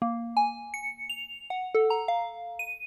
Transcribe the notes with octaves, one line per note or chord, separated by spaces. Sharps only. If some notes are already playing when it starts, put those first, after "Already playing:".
A#3
G#5
C#7
F7
F#5
A4
A#5
F5
D#7